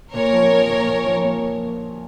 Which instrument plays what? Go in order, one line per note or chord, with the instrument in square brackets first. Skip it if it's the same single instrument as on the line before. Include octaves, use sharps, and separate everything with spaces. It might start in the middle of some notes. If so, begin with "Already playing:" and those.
[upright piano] A#2 [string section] A#4 C#5
[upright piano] F3
A#3
A#2
A#2
F3
A#3